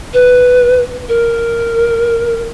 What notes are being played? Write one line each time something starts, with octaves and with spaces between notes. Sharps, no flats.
B4
A#4